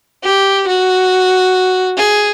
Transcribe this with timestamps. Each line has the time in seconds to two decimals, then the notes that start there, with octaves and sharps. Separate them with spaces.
0.23 G4
0.67 F#4
1.97 G#4